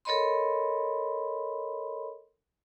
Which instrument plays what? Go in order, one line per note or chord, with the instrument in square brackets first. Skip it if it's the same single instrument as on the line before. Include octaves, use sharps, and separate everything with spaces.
[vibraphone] A4 A#4 C#5 D#5 B5 C6